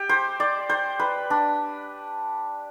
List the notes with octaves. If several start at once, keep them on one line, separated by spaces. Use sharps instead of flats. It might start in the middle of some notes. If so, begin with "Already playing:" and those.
Already playing: G4
C5
D5
C5
B4
D4